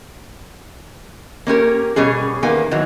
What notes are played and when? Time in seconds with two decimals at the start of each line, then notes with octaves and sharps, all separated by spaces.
1.47 A#3 C#4 G4 A#4
1.96 B2 G3 C#4 G#4
2.42 E2 D#3 A#3 B3 G#5
2.71 D#3 E3 F#3